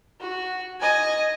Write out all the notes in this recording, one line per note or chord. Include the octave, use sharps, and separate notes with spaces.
F#4
D#5 G#5